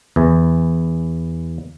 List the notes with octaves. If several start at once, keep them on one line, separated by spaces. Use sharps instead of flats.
E2 E3